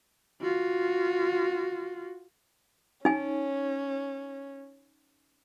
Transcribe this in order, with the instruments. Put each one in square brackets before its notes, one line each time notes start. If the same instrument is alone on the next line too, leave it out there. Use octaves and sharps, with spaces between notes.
[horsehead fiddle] F4 F#4
[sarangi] C#4 [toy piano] D#4 G#5